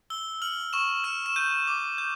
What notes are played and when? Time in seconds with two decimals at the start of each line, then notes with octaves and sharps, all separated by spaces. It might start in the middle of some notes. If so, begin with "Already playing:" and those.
0.10 E6 G7
0.42 F6 F#7
0.73 C#6 E7
1.04 F6 E7
1.26 E7
1.36 G6 D#7
1.67 D6
1.98 G6